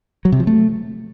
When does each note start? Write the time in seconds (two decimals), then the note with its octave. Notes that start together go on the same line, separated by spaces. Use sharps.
0.25 F#3
0.32 C3
0.40 F3
0.47 A3